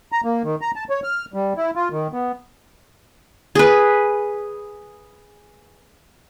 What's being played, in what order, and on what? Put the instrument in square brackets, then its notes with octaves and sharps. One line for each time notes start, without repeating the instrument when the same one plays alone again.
[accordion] A#5
A#3
D#3
A#5
A5
C#5
F6
G3
E4
F4
D#3
B3
[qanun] G#4 B4